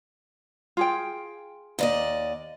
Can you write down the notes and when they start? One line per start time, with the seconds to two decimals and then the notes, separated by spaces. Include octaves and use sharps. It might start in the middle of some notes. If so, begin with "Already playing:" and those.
0.77 F4 G#4 G5
1.79 D#2 D5 D#5